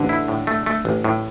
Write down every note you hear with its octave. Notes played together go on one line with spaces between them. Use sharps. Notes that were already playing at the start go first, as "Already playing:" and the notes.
Already playing: A1 D3
E4
A2
A3
A3
A1
A2